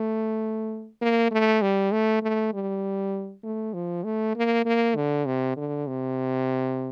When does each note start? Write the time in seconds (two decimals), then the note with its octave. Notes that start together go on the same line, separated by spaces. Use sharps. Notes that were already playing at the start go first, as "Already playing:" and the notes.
Already playing: A3
1.01 A#3
1.31 A3
1.62 G3
1.92 A3
2.22 A3
2.53 G3
3.44 A3
3.74 F3
4.04 A3
4.36 A#3
4.65 A#3
4.96 D3
5.26 C3
5.57 D3
5.87 C3